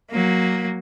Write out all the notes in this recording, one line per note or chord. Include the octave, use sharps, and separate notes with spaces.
F#3 A#3